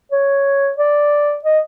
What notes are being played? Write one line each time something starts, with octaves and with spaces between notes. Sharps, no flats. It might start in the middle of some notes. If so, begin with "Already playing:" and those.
C#5
D5
D#5